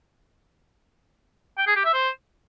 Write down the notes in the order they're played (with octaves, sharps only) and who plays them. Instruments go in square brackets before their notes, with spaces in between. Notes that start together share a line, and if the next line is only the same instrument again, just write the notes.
[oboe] G5
G#4
G4
E5
C5